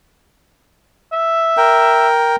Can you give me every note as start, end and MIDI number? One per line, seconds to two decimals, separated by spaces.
1.13 2.09 76
1.57 2.36 70
1.57 2.36 79